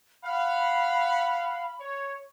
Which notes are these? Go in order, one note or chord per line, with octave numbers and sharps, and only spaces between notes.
F5 F#5 B5
C#5